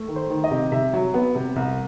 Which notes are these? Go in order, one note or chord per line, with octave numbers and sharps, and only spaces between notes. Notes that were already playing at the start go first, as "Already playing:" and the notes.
Already playing: A3
D#3
C5
D#3
D#5
C3
C3 E5
F#3
B3
C3
C2